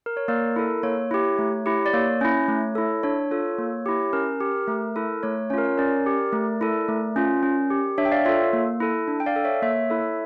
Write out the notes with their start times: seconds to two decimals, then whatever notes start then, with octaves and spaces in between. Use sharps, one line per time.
0.06 A#4
0.17 C#5
0.28 A#3 A#4 D5
0.56 E4 A4 A#4
0.83 A#3 C#5
1.11 E4 G4
1.39 A3
1.66 E4 G4
1.86 D5
1.93 A#3 C#5
2.21 C#4 E4
2.48 A3
2.75 E4 A4
3.03 D4 C#5
3.31 F4 A4
3.59 A#3
3.86 E4 G4
4.13 C#4 A#4
4.40 G4
4.68 A3
4.96 E4 A4
5.23 A3 C#5
5.50 C#4 C#5
5.54 F4 A#4
5.65 C#5
5.78 C#4 A#4 D5
6.06 G4
6.33 A3
6.61 E4 A4
6.88 A3
7.16 C#4 F4
7.43 C#4
7.71 G4
7.98 D4 C#5 E5
8.05 G5
8.12 D5 F5
8.25 F4 A4 C#5 E5
8.53 A#3
8.80 E4 A4
9.08 D4
9.20 G5
9.26 D5 F5
9.36 A4
9.44 C#5 E5
9.62 A#3 C#5 E5
9.90 E4 A4